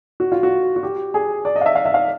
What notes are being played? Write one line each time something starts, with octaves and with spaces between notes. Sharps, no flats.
F#4
F4
F#4
F#4
G4
G#4
D5
D#5
F5
E5
F5
E5
F5